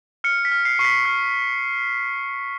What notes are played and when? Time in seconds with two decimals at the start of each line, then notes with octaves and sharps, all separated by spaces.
0.24 F6 C#7
0.45 B6
0.52 F6
0.65 C7
0.79 C#6 C7
0.85 B6
1.05 F6